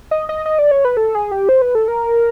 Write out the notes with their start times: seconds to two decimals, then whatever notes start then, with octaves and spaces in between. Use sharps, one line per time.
0.11 D#5
0.29 D#5
0.46 D#5
0.59 D5
0.71 C#5
0.85 B4
0.97 A4
1.15 G#4
1.31 G4
1.49 C5
1.62 B4
1.75 A4
1.88 A#4